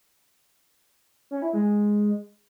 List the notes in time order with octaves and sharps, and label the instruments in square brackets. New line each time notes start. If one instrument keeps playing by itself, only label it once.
[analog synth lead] C#4
E4
G#3